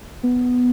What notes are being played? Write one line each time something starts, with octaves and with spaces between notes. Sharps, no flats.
B3